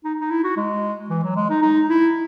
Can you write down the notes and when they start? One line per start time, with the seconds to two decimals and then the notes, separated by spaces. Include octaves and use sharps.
0.04 D#4
0.20 D#4
0.31 E4
0.44 F#4
0.57 G#3
1.10 E3
1.23 F#3
1.36 G#3
1.50 D#4
1.62 D#4
1.89 E4